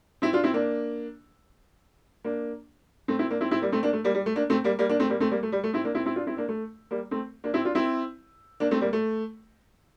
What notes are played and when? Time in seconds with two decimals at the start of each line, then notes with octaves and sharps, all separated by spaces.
0.22 C4 E4
0.33 D4 F4
0.44 C4 E4
0.54 A#3 D4
2.25 A#3 D4
3.08 A3 C4
3.19 C4 E4
3.30 A#3 D4
3.41 C4 E4
3.51 C4 E4
3.62 G3 A#3
3.72 A3 C4
3.83 A#3 D4
3.93 A3
4.04 G3 A#3
4.15 G3
4.26 A3
4.36 A#3 D4
4.50 A3 C4
4.64 G3 A#3
4.79 G3 A#3
4.89 A#3 D4
5.00 A3 C4
5.10 G3 A#3
5.20 A3 C4
5.31 G3 A#3
5.43 A3
5.52 G3
5.64 A3
5.73 C4 E4
5.84 A#3 D4
5.95 C4 E4
6.06 C4 E4
6.16 D4 F4
6.27 C4 E4
6.37 A#3 D4
6.49 A3
6.91 G3 A#3
7.11 A3 C4
7.44 A#3 D4
7.54 C4 E4
7.64 D4 F4
7.75 C4 E4
8.60 A#3 D4
8.71 A3 C4
8.81 G3 A#3
8.93 A3